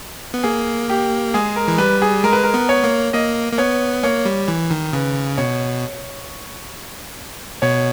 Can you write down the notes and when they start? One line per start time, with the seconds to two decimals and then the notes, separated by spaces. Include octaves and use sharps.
0.34 B3
0.43 A#3 G#4
0.89 G4
1.34 G#3 G#4
1.56 A#4
1.68 E3
1.78 G3 B4
2.02 G#4
2.24 G#3 A#4
2.33 B4
2.43 A#4
2.54 B3
2.69 C#5
2.84 A#3
3.13 A#3 D#5
3.53 A#3
3.58 B3 C#5
4.03 A#3 C#5
4.25 G3
4.48 E3
4.71 D#3
4.93 C#3 B4
5.37 B2 C#5
7.62 B2 C#5